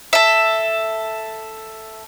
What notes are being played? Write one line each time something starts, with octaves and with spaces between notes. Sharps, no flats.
A4 E5